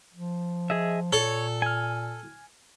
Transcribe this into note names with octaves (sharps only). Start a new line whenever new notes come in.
F3
G#4 D#5 E5
A#2 A4 C#5
G#5 F6